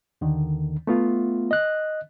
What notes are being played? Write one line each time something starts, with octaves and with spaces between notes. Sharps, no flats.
D#2 D3 D#3
A3 B3 F4
D#5 F#6